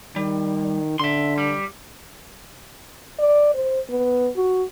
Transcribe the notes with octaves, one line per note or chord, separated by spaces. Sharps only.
D#3 G3
D3 E5 C6
G3
D5
C5
B3
F#4